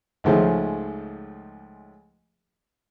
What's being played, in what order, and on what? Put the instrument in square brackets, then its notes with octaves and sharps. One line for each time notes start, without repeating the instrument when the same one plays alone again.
[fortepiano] C#2 G#2 C#3 F3 A3